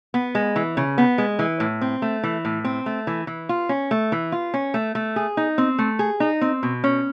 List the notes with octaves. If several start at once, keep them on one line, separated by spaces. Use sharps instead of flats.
B3
G#3
E3
C#3
B3
G#3
E3
A2
C4
A3
E3
A2
C4
A3
E3
E3
F4
C#4
A3
E3
F4
C#4
A3
A3
G#4
D#4
C4
A3
G#4
D#4
C4
B2
C#4